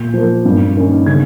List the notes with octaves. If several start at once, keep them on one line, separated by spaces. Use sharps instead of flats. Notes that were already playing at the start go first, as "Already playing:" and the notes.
Already playing: A#2 G6
F3 A#3
G2
D#3 A#3 C#4
C#3 G#6